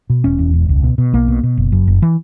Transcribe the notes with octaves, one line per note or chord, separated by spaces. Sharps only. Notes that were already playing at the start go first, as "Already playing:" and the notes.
B2
E1 C#4
E2
E1
C#2
B2
B2
B1 A#3
B2
B2
F#1
F#2
F#1
E3